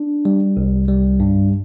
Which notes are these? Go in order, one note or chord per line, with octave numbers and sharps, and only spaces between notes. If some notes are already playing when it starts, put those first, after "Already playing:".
Already playing: D4
G3
C2
G3
G2